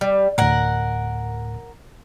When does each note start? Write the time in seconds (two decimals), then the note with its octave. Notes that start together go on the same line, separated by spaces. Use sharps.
0.01 G3
0.38 D2 A2 A#4 F#5